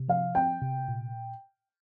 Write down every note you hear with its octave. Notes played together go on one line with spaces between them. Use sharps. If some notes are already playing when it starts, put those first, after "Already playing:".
Already playing: C3
F3 F5
C4 G5
C3
A#2